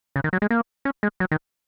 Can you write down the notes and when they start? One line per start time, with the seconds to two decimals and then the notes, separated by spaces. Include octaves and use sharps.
0.16 C#3
0.24 D#3
0.33 F#3
0.42 G#3
0.50 A#3
0.85 C#4
1.03 G#3
1.20 F#3
1.32 D#3